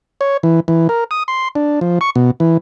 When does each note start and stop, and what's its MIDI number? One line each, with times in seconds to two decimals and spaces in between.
0.21 0.37 73
0.43 0.60 52
0.68 0.88 52
0.89 1.04 70
1.11 1.23 87
1.28 1.48 84
1.55 1.80 62
1.81 1.99 53
2.01 2.10 85
2.15 2.31 47
2.40 2.57 52